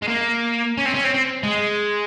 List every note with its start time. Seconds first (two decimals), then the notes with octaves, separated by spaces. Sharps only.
0.02 G#3
0.08 A#3
0.77 C#4
0.86 C4
0.94 C#4
1.04 C4
1.14 C4
1.43 G#3